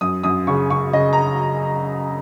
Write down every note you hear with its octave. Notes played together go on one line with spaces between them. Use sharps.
F#2 D#6
F#2 D#6
C#3 C#6
C#3 C#6
C#3 D#5
A#5